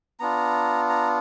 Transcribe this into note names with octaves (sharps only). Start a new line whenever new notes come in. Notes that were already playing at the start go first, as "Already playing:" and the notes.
B3 D4 F4 A#5
A#5